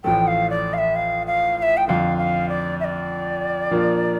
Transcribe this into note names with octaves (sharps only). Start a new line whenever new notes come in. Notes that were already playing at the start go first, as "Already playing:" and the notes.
A1 A2 F3 A3 G5
F5
D5
F5
E5
F5
F5
F5
E5
G5
F2 D3 F3 F5
F5
D5
E5
D5
A#2 F3 A#3 D4